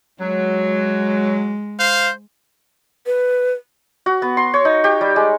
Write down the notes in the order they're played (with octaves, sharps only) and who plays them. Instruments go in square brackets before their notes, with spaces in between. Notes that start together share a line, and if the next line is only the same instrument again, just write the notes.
[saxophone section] F#3 [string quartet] G#3
[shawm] C5 [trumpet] F5
[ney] B4
[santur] F#4
B3
C6
C#5
D#4
G4
G3
G#3